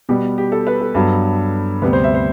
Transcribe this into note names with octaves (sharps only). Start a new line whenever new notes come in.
B2 G3 B3 G4
G4
A4
B4
A4
G2 F#3 B3
D2 C3 G3 B3 B4
C5
E5
C5